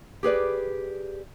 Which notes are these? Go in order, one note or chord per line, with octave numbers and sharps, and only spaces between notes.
G4 G#4 B4 D5